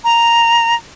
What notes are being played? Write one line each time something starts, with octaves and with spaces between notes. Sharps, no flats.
A#5